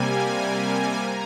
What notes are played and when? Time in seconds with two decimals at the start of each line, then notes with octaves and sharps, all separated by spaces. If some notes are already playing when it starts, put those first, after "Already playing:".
Already playing: C3 G3 A#3 G#5
0.56 G#5
0.96 A#5